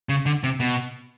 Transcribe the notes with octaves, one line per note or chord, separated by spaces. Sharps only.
C#3
D3
C3
B2